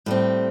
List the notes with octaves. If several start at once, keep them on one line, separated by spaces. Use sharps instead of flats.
A2 G3 C4